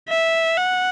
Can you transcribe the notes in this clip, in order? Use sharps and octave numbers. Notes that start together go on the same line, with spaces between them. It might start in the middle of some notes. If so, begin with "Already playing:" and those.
E5
F#5